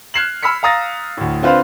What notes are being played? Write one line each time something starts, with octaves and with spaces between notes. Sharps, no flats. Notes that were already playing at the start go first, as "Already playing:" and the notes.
F6 F#6 G#6 C7 E7 F#7
B5 E6 F6 B6 C#7
F5 A#5 D#6 A6 A#6
D2 A2
D3 C4 F4 B4 C5 F5